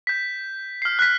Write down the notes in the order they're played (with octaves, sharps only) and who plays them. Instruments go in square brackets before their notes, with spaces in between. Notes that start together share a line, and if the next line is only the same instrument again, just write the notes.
[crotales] G6 B6
F6 C7
F#6 B6